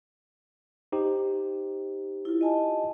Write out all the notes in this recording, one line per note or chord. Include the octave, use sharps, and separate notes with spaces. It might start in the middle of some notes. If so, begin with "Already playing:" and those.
D#4 G4 C5
E4 F4
D#5 G#5 A5